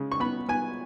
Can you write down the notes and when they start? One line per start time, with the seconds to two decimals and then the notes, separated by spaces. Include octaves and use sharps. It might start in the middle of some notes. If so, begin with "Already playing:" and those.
Already playing: C#3 G#3
0.12 C#6
0.20 B3 B5
0.49 B3 G#5